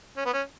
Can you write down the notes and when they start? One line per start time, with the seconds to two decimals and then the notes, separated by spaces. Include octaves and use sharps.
0.17 C#4
0.26 B3
0.33 C#4